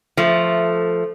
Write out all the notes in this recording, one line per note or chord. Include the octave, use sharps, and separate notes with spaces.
F3 A3